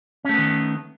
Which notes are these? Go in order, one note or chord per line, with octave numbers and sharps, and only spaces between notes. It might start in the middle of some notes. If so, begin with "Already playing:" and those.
D#3 A3 B3 C#4